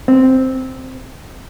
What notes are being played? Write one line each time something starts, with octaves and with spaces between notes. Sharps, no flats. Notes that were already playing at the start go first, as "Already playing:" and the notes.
C4